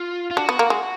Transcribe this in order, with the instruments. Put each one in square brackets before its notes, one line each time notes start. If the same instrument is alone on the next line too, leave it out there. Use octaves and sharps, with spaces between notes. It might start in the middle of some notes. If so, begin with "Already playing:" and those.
Already playing: [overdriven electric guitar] F4
F4
[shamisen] D4 [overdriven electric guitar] F#4
[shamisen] B3
A#3
G#3